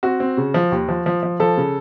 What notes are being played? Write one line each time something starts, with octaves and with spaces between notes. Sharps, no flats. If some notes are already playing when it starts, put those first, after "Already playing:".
C4 F#4
C4
C#3
F3
D#2
F3
F3
F3
F3 A4
C#3